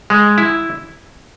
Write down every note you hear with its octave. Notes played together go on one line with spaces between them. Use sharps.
G#3
E4